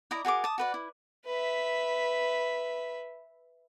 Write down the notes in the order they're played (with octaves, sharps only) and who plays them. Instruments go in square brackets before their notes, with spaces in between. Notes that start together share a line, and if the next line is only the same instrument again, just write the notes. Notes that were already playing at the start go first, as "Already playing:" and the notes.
[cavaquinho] E4 D5 D#5 A#5
F#4 G#4 A#4 D6
A5 D#6
F#4 B4 D5
E4
[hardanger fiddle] B4 E5